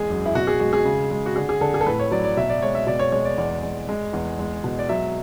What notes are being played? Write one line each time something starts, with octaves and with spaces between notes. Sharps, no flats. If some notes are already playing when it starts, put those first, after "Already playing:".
Already playing: E2 G#3 G#4
F#2
E4
B2 F#4
G#4
G#3 F#4
G#4
C#3
G#3
F#4
D3 G#4
G#4
D3 A4
G#4
A4
A2 B4
C#5
F#3 D5
D5
B2 E5
D5
G#3 C#5
E5
B2 D5
C#5
G#3 C#5
D5
E2 D5
G#3
G#3
E2
G#3
B2
D5
F#3 E5